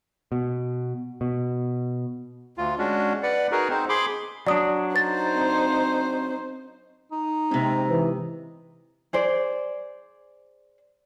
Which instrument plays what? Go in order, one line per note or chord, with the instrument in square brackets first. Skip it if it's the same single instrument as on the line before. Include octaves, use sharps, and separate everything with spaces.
[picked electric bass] B2
B2
[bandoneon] D2 F4
G#3 C#4 D4 F#4
B4 D5 F#5
D#4 F#4 G#4 A#4 B4
C4 D#4 C5
G#4 B5 C6 D6
[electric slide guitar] F#3 D4 [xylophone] D5 D#6
[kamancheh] D#4 C5 [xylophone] A6
[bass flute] C4
[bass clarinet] D#4
[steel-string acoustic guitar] G#2 C3 [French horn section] C4
[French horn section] E3
[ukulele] G#4 C5 D5